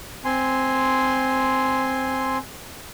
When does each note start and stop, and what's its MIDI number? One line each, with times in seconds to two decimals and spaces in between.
0.25 2.38 60
0.25 2.38 80
0.25 2.38 84